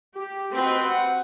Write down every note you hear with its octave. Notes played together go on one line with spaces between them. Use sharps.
G4
C4 F#4 B4 D#5
F#5